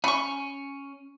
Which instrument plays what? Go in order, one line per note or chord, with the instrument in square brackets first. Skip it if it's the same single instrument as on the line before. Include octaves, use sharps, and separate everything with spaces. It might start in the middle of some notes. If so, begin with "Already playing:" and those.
[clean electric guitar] C#4 [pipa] B5 C#6